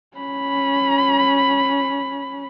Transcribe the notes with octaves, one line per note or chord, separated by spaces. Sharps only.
C#4 B5